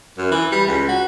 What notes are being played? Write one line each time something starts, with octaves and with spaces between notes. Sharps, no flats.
F#2
E3
G3
C#2
F#4